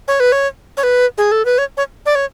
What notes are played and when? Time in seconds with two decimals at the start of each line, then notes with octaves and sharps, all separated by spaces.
0.08 C#5
0.20 B4
0.32 C#5
0.77 C#5
0.83 B4
1.18 G#4
1.31 A4
1.45 B4
1.58 C#5
1.77 C#5
2.06 D5
2.15 C#5